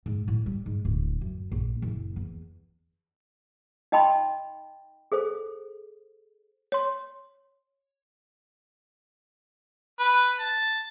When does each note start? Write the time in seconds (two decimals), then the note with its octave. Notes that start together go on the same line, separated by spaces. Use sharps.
0.06 G#2
0.28 A2
0.46 G3
0.66 G#2
0.85 D1
1.21 F#2
1.52 A#1
1.82 F#1
2.16 E2
3.92 D#4 D#5 G5 A5 B5 C6
5.12 G#4 A4 C5
6.72 C#5 C6
10.00 B4
10.40 A5